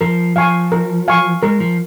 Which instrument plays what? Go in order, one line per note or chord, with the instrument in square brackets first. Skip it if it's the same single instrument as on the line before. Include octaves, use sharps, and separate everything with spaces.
[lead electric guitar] F3 [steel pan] A#4
[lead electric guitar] F3 [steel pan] F5 G#5 C#6
[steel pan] A#4
F5 G#5 C#6
[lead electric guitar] G#3 [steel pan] A#4
[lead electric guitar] F3